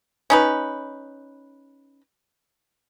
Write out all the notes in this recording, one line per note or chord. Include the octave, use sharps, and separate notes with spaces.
C#4 D#4 B4